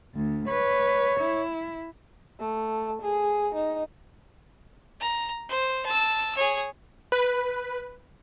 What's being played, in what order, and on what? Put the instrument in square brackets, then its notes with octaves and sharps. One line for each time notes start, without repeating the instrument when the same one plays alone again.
[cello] D2
[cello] B4 [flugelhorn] C#5
[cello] E4
[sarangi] A3
G#4
D#4
[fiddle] A#5
C5
A5 E6
G#4 C#5
[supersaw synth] B4